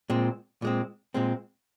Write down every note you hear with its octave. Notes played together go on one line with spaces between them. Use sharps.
A#2 G#3 C4
A#2 G#3 C4
A#2 G#3 C4